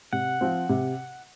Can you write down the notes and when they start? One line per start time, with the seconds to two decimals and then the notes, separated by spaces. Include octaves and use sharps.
0.13 C3 F#5
0.41 F3 C4
0.69 C3